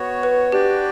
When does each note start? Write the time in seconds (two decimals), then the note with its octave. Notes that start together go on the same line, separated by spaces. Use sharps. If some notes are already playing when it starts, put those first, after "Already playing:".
Already playing: B3 F#4 C#5
0.23 B4
0.52 D4 F#4 G4 B4 D5 G5